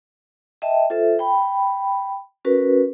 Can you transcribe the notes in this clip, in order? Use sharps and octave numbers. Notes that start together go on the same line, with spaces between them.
D#5 E5 G5 A5
F4 A4 C5 E5
G5 B5
C#4 F#4 A#4 B4